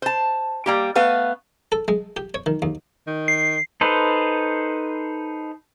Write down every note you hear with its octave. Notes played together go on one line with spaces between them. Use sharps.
C5 A5
G3 A#3 G4
A3 B3 B4 F5
A4
G#3
G4
C#5
D#3
D#2
D#3
C7
D#4 A4 B4 C5